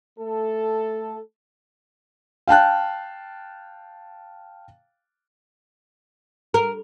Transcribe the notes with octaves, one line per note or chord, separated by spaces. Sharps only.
A3 A4
F5 G5 A5 F#6
A#4